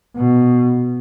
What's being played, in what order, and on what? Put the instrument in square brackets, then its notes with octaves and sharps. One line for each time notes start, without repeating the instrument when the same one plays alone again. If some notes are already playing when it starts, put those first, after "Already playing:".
[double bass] B2